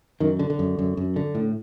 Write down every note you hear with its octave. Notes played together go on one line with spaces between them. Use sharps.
F#2 D#3
D3
D3
F#2
F#2
F#2
D3
A2